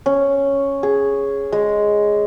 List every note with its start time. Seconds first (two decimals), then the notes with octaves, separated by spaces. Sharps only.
0.06 C#4
0.83 G#4
1.52 G#3